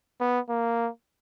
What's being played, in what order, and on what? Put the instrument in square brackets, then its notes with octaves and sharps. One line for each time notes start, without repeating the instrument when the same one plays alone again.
[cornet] B3
A#3